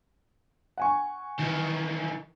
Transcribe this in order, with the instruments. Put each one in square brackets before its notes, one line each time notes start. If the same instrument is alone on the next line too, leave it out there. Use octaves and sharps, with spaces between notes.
[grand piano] F#5 G#5 C#6
[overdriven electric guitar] D#3 E3